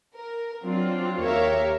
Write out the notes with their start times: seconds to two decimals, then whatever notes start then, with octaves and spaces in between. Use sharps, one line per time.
0.14 A#4
0.63 F#3 C4 D4 F4
1.22 D#2 G4 A#4 C#5 E5 F5